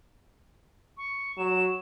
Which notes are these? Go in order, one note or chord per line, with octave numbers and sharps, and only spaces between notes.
C#6
F#3 E7